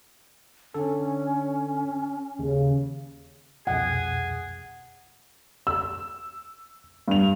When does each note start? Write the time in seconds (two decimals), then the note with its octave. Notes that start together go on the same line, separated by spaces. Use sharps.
0.74 D3 C#4 A4
2.39 D#2 C#3
3.67 C2 F2 B2 G#4 F#5
5.67 E6
7.08 G2 F7